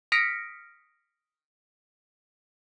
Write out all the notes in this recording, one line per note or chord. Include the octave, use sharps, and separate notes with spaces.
D#6 F6 A#6 B6 C#7 D7